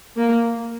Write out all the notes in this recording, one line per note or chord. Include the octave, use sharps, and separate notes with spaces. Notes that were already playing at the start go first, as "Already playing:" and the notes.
A#3